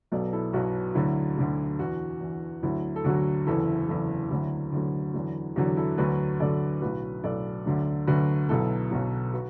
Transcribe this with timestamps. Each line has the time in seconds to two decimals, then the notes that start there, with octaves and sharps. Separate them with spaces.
0.12 B1 B2 F#3 A4 D5
0.32 E4 A4
0.53 B1 B2 F#3 F#4
0.95 D2 D3 F#3 E4
1.37 D2 D3 F#3
1.79 E2 E3 F#4
2.21 E2 E3
2.63 D2 D3 F#3 E4
2.96 A4
3.04 D2 D3 F#3 F#4
3.47 F#1 E2 E3 E4 A4
3.88 F#1 E2 E3 E4 A4
4.31 D2 D3 F#3 E4
4.72 D2 D3 F#3
5.14 E2 D3 F#3
5.56 E2 D3 F#3 F#4
5.77 E4 A4
5.97 D2 D3 F#3 F#4 B4
6.40 D2 D3 F#3 A4 D5
6.82 B1 A2 F#3 F#4 B4
7.23 B1 A2 F#3 A4 D5
7.66 D2 D3 F#3
8.07 D2 D3 F#3 F#4 B4
8.49 B1 B2 F#3 E4 A4
8.91 B1 B2 F#3 F#4
9.33 F#4 B4